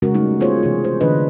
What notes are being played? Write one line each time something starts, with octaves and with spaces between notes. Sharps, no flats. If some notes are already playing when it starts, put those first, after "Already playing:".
C#3 G#3 C#4 F#4 A#4
G3 A3 D#4
B3 F4 G#4 C5 C#5
C3 E3 A3 G#4
C5
D3 E3 D4 B4 D#5